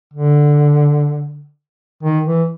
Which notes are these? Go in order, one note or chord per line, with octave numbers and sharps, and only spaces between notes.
D3
D#3
E3